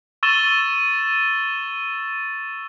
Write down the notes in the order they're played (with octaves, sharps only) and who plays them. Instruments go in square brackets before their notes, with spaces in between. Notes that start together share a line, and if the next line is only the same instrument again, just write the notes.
[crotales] C#6 E6 A6 D#7 E7 G7